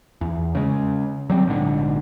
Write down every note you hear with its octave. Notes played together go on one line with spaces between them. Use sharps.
E2
C#3 G#3
F#3 G3 C4
A#1 G#2 D3